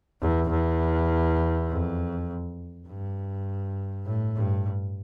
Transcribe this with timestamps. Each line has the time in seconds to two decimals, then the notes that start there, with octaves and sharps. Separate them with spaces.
0.22 E2
0.50 E2
1.69 F2
2.87 G2
4.06 A2
4.36 G2